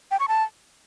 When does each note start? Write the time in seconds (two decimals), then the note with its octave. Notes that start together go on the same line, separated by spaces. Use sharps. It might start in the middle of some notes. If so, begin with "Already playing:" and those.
0.11 G5
0.20 C#6
0.28 A5